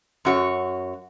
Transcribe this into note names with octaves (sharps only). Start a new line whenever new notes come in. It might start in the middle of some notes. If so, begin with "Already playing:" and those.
F#2 F#4 C#5